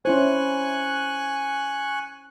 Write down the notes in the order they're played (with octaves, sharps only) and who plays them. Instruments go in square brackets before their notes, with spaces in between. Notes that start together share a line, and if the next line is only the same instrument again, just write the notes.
[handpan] C#4 E4 C5 [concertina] G#5 C#6 F#6